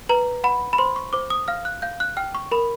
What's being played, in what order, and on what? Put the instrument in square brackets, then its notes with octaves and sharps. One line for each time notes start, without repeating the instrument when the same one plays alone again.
[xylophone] B4 A#5
F#5 B5
B5
C5 C6
C#6
C5 D6
D#6
F5 F6
F#6
F5 G6
F#6
G5 F6
C#6
A#4 B5